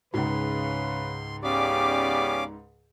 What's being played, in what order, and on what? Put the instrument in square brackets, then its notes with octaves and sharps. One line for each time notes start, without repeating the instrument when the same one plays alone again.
[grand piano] C#2 G#2 [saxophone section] C#3 [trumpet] B4 [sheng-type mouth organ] C6
[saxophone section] C#3 B3 D5 [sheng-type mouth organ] C#4 F5 D6 [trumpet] G4